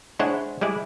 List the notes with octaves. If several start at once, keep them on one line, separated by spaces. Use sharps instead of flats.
G#3 D4 E4 C5 C#5 F#5
G3 G#3 E4 D5